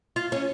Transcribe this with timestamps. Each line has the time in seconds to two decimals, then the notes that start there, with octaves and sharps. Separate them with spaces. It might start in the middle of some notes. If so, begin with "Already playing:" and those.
0.16 F4
0.32 C#4